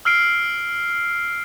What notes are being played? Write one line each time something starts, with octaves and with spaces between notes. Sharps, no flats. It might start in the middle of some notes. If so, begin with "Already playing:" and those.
E6 F6 C7 D7